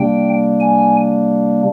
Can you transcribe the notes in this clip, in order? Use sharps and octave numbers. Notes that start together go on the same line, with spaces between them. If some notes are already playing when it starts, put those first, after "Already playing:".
Already playing: C3 G3 A#3 D4 G5
G#5